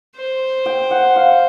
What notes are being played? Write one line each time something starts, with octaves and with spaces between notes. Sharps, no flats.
C5
G5
F#5
F5